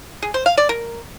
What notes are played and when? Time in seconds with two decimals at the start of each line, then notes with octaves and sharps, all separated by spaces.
0.22 G#4
0.34 C5
0.46 F5
0.57 D5
0.69 A#4